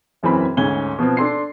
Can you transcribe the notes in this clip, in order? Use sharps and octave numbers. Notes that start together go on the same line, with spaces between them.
E1 F#2 E3 C4 B5
D2 G#2 C#4 G#6 G7
B2 F3 B3 C4
D4 A4 C6 C7